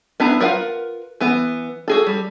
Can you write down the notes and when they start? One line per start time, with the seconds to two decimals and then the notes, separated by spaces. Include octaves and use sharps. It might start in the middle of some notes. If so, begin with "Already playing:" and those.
0.20 B3 D4 E4 A#5
0.41 F4 A#4 B4 F5 F#5
1.21 E3 B3
1.88 F#4 G#4 A4
2.07 G3